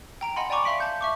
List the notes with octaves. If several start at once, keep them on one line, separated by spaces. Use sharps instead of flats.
G5 A#5 D7
D#5 F#5 G#5 B5 C6
D5 G5 G#5 A#5 C#6 D6
E5 F5 C6 B6 D7 F#7
A5 G6 C#7
E5 C#6 D6